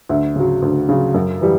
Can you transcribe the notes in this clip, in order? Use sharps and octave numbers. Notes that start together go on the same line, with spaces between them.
D2 E5
C#3 F#3
D2
C#3 F#3
F#2
E3 G3